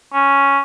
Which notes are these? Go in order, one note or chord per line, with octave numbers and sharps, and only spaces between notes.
C#4